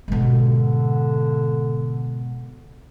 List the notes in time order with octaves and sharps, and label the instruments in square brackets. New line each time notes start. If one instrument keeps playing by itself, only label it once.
[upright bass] G#2 B2 [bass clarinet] D3